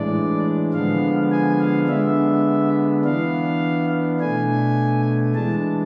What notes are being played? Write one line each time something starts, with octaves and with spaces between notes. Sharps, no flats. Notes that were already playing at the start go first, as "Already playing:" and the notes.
Already playing: A2 E3 G#3 D4 D5
D3 F3 G#3 B3 D4 F5
G#5
F5
D3 G#3 B3 D4 E5
E3 B3 D4 F5
B2 A3 D4 G#5
E3 G#3 D4 A5